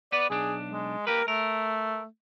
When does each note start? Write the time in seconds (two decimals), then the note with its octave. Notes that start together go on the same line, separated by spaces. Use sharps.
0.12 B3 B4 D5
0.30 B1 D4 G#4
0.71 G#3
1.07 A#3 G4 A#4 B4
1.28 A3 A#4